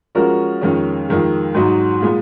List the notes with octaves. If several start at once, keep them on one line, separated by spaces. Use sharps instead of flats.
F3 G#3 C#4 F#4 A#4
F2 D#3 G#3 C#4
F2 D#3 G#3
G#2 F#3 B3 D#4 F#4
A#2 G#3 B3